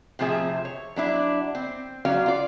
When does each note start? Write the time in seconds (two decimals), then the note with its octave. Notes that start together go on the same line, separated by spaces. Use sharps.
0.19 A2 C3 F3 G#4 E5
0.65 C#5
0.96 F#3 D4 E4
1.55 C4
2.05 F#3 C#4 F#4 D5 F5
2.26 F4 D5